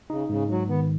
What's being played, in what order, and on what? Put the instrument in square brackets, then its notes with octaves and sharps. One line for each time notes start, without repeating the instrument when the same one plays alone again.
[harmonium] C#3 [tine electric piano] D#4
[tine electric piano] G#2 [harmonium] C#3
[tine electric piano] G#2 [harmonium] F#3
[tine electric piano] D#3 [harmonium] B3